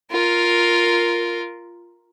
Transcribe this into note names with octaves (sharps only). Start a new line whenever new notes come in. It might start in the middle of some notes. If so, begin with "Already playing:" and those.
F4 A#4